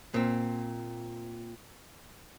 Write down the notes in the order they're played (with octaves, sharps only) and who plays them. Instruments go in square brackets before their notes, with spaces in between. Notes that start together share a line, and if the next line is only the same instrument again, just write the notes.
[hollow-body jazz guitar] A#2 C4